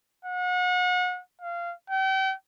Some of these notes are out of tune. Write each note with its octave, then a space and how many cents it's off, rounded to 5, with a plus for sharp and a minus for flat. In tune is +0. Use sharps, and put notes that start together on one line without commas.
F#5 -35
F5 -20
G5 -40